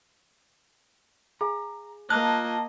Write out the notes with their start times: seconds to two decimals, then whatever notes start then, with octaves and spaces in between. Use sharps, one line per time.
1.41 G#4 F5 G#5 A#5
2.10 A#3 F4 D#5 A5 F6 F#6